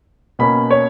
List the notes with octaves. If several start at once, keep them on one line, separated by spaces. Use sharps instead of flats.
B2 A#3 C#4 B5
C#5